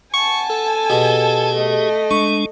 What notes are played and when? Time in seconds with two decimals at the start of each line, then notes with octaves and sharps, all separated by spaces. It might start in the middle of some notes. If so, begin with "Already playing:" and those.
0.14 F#5 G#5 A5 C#6
0.50 A4
0.90 B2 G4 G#4
1.54 A3 D#5
2.11 G#3 D4 C#6